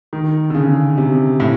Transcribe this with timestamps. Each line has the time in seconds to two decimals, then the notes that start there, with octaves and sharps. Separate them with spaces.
0.13 D#3
0.50 D3
0.55 C#3
0.97 C3
1.40 A2